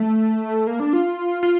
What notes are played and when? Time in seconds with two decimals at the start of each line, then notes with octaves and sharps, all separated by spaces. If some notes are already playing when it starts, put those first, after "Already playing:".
Already playing: A3
0.67 A#3
0.80 D4
0.93 F4
1.43 F4